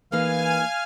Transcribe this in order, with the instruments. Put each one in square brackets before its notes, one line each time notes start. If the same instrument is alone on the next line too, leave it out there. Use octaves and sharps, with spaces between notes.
[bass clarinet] E3 [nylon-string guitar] A#3 D#4 G#4 [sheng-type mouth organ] F5 F6 [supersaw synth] G#5